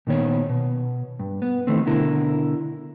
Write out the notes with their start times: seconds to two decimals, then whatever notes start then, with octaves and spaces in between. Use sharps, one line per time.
0.07 A#2 D#3 B3 C#5
0.49 B2
1.19 G2
1.42 B3
1.67 D#3 E3 A3 C4
1.86 B2 D3 E4 A#4